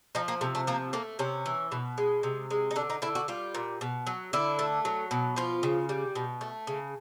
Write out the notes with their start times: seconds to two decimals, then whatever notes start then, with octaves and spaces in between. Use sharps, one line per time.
0.15 F3 D#4
0.28 A#3
0.41 C3 A3
0.55 A3
0.67 F3 A#3
0.93 A3 A#3
1.19 C3 C#4
1.46 E3
1.72 B2
1.98 G#3
2.23 C3
2.51 G#3
2.71 D#4
2.76 D3 D4
2.90 D#4
3.02 D3 E4
3.15 F#4
3.28 G3 F4
3.55 A#2
3.81 B2
4.07 F#3
4.33 D3 E4
4.59 A3
4.85 F#3
5.11 B2
5.36 F3 F4
5.63 C#3
5.89 G3
6.15 B2
6.41 A3
6.67 C#3